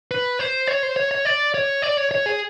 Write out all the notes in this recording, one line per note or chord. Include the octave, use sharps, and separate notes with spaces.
B4
C5
C#5
C5
C#5
C#5
D5
C#5
D5
C#5
C#5
G#4